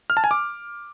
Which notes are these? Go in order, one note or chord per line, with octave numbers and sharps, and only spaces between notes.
F6
A5
G#5
D6